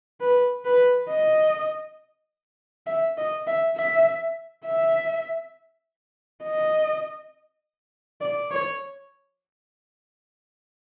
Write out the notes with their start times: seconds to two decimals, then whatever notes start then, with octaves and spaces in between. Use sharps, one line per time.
0.20 B4
0.65 B4
1.09 D#5
2.87 E5
3.17 D#5
3.47 E5
3.77 E5
4.65 E5
6.43 D#5
8.21 D5
8.51 C#5